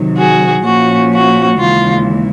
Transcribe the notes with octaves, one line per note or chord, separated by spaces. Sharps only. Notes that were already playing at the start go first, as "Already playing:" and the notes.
Already playing: C3 D#3 F#3
F#4 G#4
A#2 F3 A#3 C#4 F#4
F#4
D#2 C#3 E3 G#3 F4